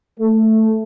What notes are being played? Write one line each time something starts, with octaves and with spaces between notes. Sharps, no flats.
A3